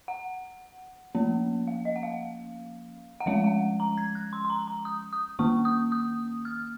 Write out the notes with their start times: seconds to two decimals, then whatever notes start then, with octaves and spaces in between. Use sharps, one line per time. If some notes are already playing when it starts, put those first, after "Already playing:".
0.08 F#5
1.15 F3 A#3 C#4
1.67 F5
1.85 D#5
1.96 F#5
2.03 F5
3.20 F#5
3.26 F3 G#3 C#4 F5
3.44 F#5
3.80 A#5
3.97 G#6
4.15 F#6
4.33 C6
4.45 C6
4.50 A#5
4.67 A#5
4.85 D#6
5.13 D#6
5.39 D#3 A#3 C#4 C#6
5.65 D#6
5.92 D#6
6.45 F6